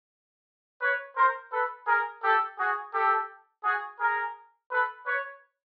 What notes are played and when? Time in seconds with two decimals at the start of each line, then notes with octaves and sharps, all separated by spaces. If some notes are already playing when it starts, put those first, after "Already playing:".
0.82 B4 C#5
1.16 A#4 C5
1.51 A4 B4
1.87 G#4 A#4
2.23 G4 A4
2.58 F#4 G#4
2.93 G4 A4
3.64 F#4 G#4
3.99 G#4 A#4
4.71 A4 B4
5.06 B4 C#5